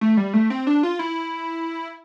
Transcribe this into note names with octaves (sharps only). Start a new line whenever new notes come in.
A3
G3
A3
C4
D4
F4
E4